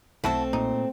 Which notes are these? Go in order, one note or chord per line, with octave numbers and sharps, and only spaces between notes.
B1 A3 C4 E4 F#4 A4
A#2 D#4